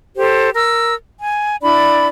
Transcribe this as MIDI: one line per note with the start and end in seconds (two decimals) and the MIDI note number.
0.16 0.48 67
0.16 0.48 69
0.16 0.48 72
0.54 0.94 70
0.54 0.94 88
1.20 1.56 80
1.62 2.07 62
1.62 2.07 64
1.62 2.07 74
1.62 2.07 83